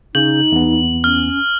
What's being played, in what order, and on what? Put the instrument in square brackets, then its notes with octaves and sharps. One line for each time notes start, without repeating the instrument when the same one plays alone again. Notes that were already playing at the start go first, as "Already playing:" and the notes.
[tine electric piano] C#3 G6 [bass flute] D#4 [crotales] F#7
[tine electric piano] E2 B3
[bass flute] C#4 [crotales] F6